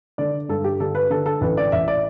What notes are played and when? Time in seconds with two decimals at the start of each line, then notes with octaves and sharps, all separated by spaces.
0.18 D3 D5
0.49 G2 A4
0.64 G4
0.80 D3 A4
0.95 B4
1.10 D3 A4
1.26 A4
1.41 A1 B4
1.57 D5
1.72 A1 E5
1.88 D5